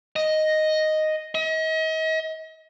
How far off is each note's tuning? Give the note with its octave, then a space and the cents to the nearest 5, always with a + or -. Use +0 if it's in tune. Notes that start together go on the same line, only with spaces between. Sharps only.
D#5 +0
D#5 +40